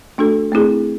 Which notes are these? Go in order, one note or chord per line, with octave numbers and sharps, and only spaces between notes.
A3 D4 F#4 A4
A3 C4 E4 G#4